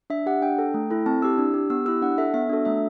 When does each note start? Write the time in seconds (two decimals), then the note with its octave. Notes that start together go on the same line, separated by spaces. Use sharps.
0.10 D4 E5
0.26 G4 F#5
0.42 D4 G5
0.59 A4
0.74 A3
0.90 E4 A4
1.06 C4 A5
1.22 E4 G4 E6
1.38 D4
1.54 G4
1.70 B3 E6
1.86 E4 G4 E6
2.02 D4 F#5
2.18 A4 E5
2.34 B3 E5
2.49 D4 F#4 A4
2.65 A3 E5